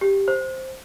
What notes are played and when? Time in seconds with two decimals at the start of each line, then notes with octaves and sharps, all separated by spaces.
0.01 G4
0.28 C5